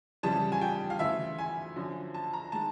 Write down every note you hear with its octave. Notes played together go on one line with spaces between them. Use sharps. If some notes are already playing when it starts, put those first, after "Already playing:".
F2 C#3 E3 G3 A5
G#5
G5
F5
D2 C#3 E3 E5
G#5
F#2 D3 F3
A5
A#5
D#3 G#3 A5